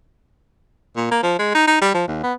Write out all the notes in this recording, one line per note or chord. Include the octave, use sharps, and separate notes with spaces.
A#2
A#3
F3
G#3
D#4
D#4
G3
F3
D#2
B3